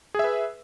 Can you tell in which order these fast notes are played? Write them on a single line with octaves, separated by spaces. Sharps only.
G#4 E5 B4